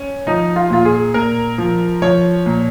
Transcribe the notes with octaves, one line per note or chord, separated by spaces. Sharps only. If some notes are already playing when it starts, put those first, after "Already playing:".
Already playing: C#4
F3 D#4
F4
A#2 F4
G#4
A#2 A#4
F3
F3 C#5
A#2